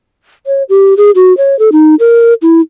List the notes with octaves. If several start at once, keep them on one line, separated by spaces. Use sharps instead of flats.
C#5
G4
G#4
F#4
C#5
A4
D#4
A#4
E4